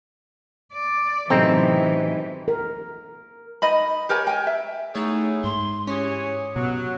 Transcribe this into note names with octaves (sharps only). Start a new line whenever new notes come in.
D5
A2 C3 E3 F#3 C4 C#4 D#4 A4
A#4
D#4 D#5 B5
G4 A#4 C#5 G#5
G5 G#5
E5
A3 B3 D#4 E4 G#4 C#5
G#2 C6
E3 C#4 G4 G#4 C#5
B2 F#3